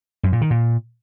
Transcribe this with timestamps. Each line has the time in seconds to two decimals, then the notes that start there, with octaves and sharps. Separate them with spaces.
0.23 F#2
0.32 A#2
0.41 D#3
0.50 A#2